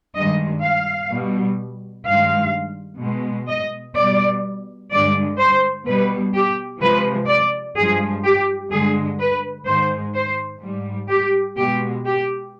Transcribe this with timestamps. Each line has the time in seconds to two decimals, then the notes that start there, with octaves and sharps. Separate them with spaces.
0.14 G2 D#3 G#3 D#5
0.63 F5
1.10 B2 G3
2.05 G2 D#3 G#3 F5
3.00 B2 G#3
3.47 D#5
3.95 B2 G3 D5
4.91 G2 D3 G#3 D5
5.39 C5
5.85 B2 G3 B4
6.34 G4
6.81 C3 F3 G#3 B4
7.28 D5
7.76 G2 F3 G#3 G#4
8.24 G4
8.71 G2 D3 G#3 G#4
9.19 B4
9.67 G#2 D#3 G#3 C5
10.14 C5
10.61 G#2 G3
11.09 G4
11.56 B2 G#3 G4
12.05 G4